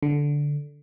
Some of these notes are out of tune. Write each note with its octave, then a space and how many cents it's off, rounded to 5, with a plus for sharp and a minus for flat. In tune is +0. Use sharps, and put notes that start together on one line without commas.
D3 -10